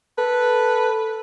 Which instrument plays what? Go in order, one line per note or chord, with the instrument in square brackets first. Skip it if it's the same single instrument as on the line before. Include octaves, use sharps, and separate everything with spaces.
[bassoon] A4 [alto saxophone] B4